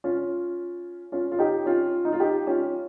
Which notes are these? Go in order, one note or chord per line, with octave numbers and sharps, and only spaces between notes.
C#4 F4
C#4 F4
F4
D#4 G4
C#4 F4
D#4
F4
D#4 G4
C#4 F4